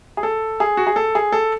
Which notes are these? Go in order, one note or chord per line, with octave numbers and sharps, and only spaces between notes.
G#4
A4
G#4
F#4
G#4
A4
G#4
A4